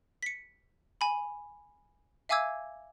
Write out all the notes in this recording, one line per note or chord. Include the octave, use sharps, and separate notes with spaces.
B6 C#7
G#5 B5
E5 F5 G#5 D6 E6 G#6